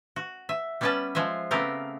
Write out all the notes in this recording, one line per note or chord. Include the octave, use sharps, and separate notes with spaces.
F#4
E5
G3 B3 C#4 B4 G5 A5
F3 G#3 C5 E5
C#3 A3 B3 C4 G4 A#4